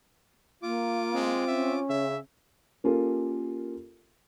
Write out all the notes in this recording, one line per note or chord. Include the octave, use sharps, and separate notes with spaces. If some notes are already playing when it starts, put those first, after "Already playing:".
A#3 F4 D6
G#3 C4
C#4 E5
C#3 E5
A#3 C#4 F4 G4 A4 A#4